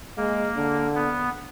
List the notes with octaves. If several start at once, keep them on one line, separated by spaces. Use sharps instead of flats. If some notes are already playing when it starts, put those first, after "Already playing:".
G#3 A#3
D3
B3